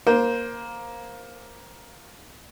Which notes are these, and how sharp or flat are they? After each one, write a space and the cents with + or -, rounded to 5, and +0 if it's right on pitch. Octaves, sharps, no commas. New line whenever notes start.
A#3 +10 C5 +0